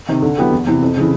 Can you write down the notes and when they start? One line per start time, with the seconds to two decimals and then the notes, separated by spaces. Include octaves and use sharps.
0.09 C3 D#3
0.22 D3
0.38 F#3 B3 E4 G4
0.52 E2
0.67 C3 E3
0.82 F2
0.97 C#3 E3